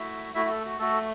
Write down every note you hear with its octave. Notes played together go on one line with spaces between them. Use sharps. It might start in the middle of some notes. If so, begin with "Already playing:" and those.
Already playing: A3 E4 F#4 E5
A3 E4 F#4 E5
F#4
A4
F#4
A3 F#4 A4